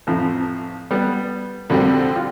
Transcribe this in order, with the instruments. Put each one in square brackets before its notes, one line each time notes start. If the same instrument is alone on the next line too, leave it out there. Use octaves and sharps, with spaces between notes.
[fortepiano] A1 F2 F3
G3 B3
[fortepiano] F2 A#2 B5 [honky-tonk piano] D3 G3 C4
[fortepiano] F4